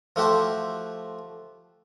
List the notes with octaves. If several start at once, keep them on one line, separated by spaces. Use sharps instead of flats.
F3 A3 F#4 G4 C5